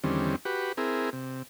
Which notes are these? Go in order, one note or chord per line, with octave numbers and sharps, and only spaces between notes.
E2 D3 D#3 G3 C4 C#4
F#4 G4 B4
C4 E4 G#4 A#4
C3